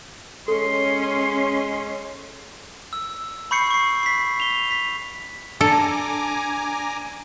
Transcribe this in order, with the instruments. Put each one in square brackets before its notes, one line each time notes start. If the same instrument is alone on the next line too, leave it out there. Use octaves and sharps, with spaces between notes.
[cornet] G#3 [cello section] C#4 [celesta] A4 [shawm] C6
[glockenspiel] E6
B5 C#6 G6 C7 C#7
C#6 C7
B6 C7
F7 G7
B6
[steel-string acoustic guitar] D4 [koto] A4 [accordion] G#5 A#5 D6